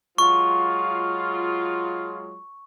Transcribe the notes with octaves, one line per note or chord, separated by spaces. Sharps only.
F#3 G#3 F4 C#6